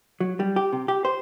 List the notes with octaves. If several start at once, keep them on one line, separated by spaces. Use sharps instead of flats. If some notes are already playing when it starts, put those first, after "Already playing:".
F#3
G3
G4
C3
G4
C5